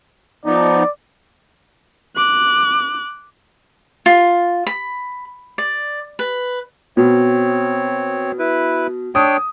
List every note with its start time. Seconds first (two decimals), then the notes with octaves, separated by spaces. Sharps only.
0.46 F3 B3 D#4 D5
2.16 D6 F#6
4.06 F4
4.67 B5
5.58 D5
6.19 B4
6.97 B2 C4 C#5
8.39 E4 B4
9.15 D4 C#5 G5 D#6